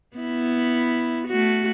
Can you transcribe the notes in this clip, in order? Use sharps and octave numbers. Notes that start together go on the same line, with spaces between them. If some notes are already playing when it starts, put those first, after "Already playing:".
B3 E4
A3 F#4